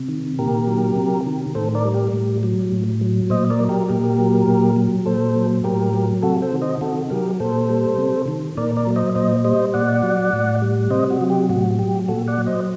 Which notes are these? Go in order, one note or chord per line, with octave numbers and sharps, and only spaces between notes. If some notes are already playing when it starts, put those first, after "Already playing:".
Already playing: C3
D#3
A#2 G4 A#4
F#3
C3
D#3
A2 A4 C5
A#4 D5
G3
G4 A#4
A2
F#3
A2
F#3
A#2 C5 D#5
A#4 D5
F#3
G4 A#4
A#2 G4 A#4
F#3
A#2
F#3
A#2 A4 C5
F#3
A2 G4 A#4
F#3
C3 F#4 A4
A4 C5
D#3
C5 D#5
C3 F#4 A4
F#3 G4 A#4
A#2 A4 C5
G3
C3
D#3
A#2 A#4 D5
A#4 D5
F#3
C5 D#5
A#2 C5 D#5
G3 C5 D#5
A#2 D5 F#5
F#3
A2
G3
C3 C5 D#5
F#4
F#3
G4
A2 F#4
F#3 G4
A#2 F#4 A4
D5 F#5
F#3
C5 D#5